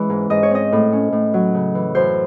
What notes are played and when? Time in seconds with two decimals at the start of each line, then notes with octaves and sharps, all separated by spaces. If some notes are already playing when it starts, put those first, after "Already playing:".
Already playing: E3 G#3 C#4
0.10 G#2
0.30 G#2 D#5
0.43 C#5
0.51 C4 D#5
0.72 A2
0.92 C#4
1.12 A2
1.34 F#3
1.54 C#3
1.75 E3
1.95 F#2 C5